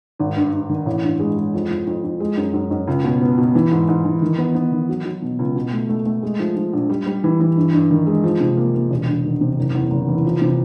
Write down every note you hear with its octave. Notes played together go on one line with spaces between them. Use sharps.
G#1
G2
G2
D#3
A1
G2
G#3
G#3
F2
F2
F2
F2
G#3
F#2
F#2
F#2
C#2
B2
B3
B2
E3
G#2
G#2
E3
D#3
B3
B3
D#3
F#3
F#3
B2
C#2
B2
A3
A3
A3
G#3
F3
F3
A#1
G3
G3
E3
E3
G2
G2
D#3
G#3
F3
C3
A#3
A#3
E1
D2
D#3
C3
F#1
E2
F#1
E3
F3
C3